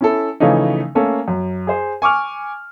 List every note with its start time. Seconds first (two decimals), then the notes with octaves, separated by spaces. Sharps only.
0.01 C#4 E4 A4
0.40 C#3 E3 F3 A3 C#4 D#4
0.95 A3 A#3 C#4 A4
1.28 F#2
1.67 G#4 C5
2.02 G#5 C#6 D6 F6